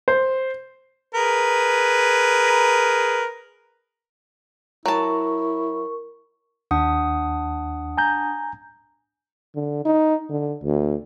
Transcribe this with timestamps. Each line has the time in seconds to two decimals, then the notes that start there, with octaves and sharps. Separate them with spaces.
0.08 C5
1.14 G#4 A#4 B4
4.86 F#3 E4 A#4 A5 C#6
6.71 D#2 D4 F#5 D#6
7.97 G#5 A#5 G6
9.55 D3
9.85 D#4
10.30 D3
10.64 D2